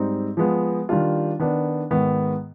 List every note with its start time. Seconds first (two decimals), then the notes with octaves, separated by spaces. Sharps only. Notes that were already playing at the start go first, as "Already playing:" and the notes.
Already playing: G#2 G3 C4 D#4
0.37 F3 G#3 B3
0.89 D#3 G3 D4 F4
1.39 D#3 B3 D4
1.91 G#2 D#3 B3